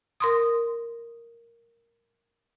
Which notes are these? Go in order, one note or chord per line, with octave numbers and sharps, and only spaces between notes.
A#4 C6 D#6